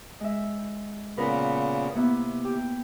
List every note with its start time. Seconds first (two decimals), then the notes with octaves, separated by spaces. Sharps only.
0.20 G#3 E5
1.17 A#2 C#3 B3 A#4 B4
1.94 C3 A#3 B3 E4
2.45 G4